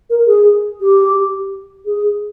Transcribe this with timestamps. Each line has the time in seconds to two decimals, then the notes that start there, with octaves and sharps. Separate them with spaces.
0.10 A#4
0.27 G#4
0.81 G4
1.86 G#4